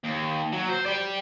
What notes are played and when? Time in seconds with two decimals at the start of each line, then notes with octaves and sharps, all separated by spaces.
0.04 D#2
0.52 F#3
0.69 C5
0.86 G4 D5